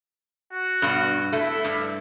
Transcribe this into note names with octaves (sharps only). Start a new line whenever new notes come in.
F#4
G2 B2
A3 E4
G2